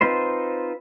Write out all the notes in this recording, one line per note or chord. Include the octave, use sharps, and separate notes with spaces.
C4 D#4 F4 B4 C5